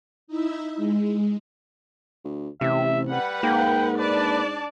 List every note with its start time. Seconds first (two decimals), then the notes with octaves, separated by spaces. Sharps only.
0.27 D#4 E4 E5
0.76 G#3
2.24 D2
2.61 A1 C3 E5
3.10 G3 B4 F#5
3.43 G#2 A#3 G5
3.99 D4 B4 D5 A5